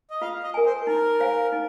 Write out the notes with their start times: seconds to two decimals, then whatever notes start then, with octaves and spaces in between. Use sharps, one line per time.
0.10 D#5
0.22 F4 F5
0.43 D#5
0.54 A#4 G#5
0.66 C5
0.87 D#4 A#4
1.20 C5 F5 G#5
1.52 D#4